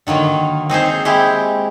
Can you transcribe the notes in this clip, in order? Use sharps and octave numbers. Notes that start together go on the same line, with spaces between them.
D3 D#3 F#3 A#3
C4 D#4 G#4 C5
G#3 C4 E4 G4